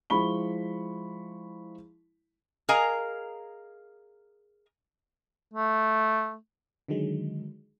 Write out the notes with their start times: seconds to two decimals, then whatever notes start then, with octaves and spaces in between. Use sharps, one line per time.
0.10 F3 G#3 E4 B5 C#6 G7
2.69 G#4 A#4 D#5 F5 G#5 A#5
5.53 A3
6.88 D3 D#3 F#3 G#3